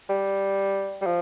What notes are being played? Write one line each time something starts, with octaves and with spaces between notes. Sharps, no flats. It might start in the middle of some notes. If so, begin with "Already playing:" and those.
G3
G3
F3